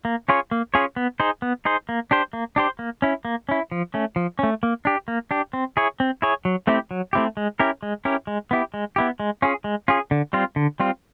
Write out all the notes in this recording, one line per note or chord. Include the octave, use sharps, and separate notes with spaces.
A#3
C#4 F4 G#4 C#5
A#3
C#4 F4 G#4 C#5
B3
D#4 G#4 C5
B3
D#4 G#4 C5
A#3
D4 G4 C5
A#3
D4 G4 C5
A#3
C#4 E4
A#3
C#4 E4
F3
A3 C#4
F3
A3 C#4
A#3
D4 G4
A#3
D4 G4
C4
E4 G#4 C#5
C4
E4 G#4 C#5
F#3
A3 C4 E4 G4
F#3
A3 C4 E4 G4
G#3
C#4 E4 G4 A#4
G#3
C#4 E4 G4 A#4
G#3
B3 E4 G4
G#3
B3 E4 G4
G#3
C#4 F4 G#4
G#3
C#4 F4 G#4
D3
G3 C4 F4
D3
G3 C4 F4